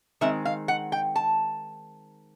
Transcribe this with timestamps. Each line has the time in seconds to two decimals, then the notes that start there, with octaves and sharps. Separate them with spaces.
0.21 D#3 G#3 C4 E5
0.45 F5
0.68 F#5
0.92 G5
1.16 A5